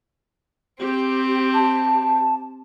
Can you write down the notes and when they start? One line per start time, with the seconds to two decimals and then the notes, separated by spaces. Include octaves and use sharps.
0.79 C4 G4
1.54 A5